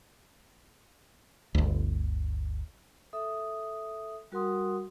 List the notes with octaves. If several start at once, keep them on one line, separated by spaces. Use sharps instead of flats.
G1 D2
A4 E5 D#6
G3 F#4 A#4 F#5 C6 D#6